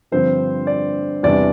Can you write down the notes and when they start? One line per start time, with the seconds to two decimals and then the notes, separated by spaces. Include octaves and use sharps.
0.12 G2 D3 F3 C4 C5
0.67 D5
1.23 E2 C3 G3 B3 D4 D5